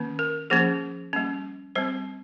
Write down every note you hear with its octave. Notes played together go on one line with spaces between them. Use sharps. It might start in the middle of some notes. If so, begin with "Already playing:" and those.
Already playing: D#3 A#3 C#4
A#4
F3 A#3 C#4 G#4
G3 A#3 C#4
G3 C4 C5